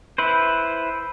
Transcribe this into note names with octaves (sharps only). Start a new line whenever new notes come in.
E4 B4 C5